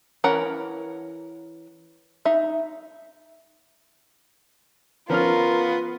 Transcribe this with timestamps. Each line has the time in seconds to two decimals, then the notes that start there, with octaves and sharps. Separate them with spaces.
0.24 E3 C#4 A#4 F#5 A#5
2.25 D#4 E5
5.10 F3 B3 C#4 F4 A#4 F6